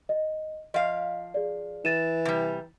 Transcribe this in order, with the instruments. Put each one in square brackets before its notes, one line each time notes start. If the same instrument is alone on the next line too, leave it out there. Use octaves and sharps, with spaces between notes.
[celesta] D#5
[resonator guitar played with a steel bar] F3 F5 [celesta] D#5
[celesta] G#4 D5
[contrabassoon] E3 [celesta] A6 D#7 E7
[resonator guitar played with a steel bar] C3 G3